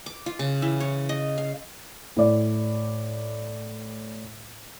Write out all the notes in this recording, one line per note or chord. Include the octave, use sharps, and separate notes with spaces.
D6
F4
C#3
E3
C#5
D#5
F5
A2 D5